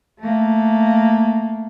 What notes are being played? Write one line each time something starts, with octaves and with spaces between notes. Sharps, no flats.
A3 A#3